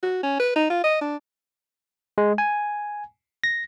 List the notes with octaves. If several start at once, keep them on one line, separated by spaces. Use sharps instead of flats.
F#4
C#4
B4
D#4
F4
D#5
D4
G#3
G#5
A#6